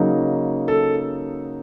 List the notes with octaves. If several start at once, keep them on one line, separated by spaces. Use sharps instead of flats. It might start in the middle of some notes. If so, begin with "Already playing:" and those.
Already playing: C#3 F#3 A#3 D#4
A4